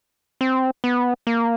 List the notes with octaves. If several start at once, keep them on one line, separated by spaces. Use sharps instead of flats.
C4
B3
A#3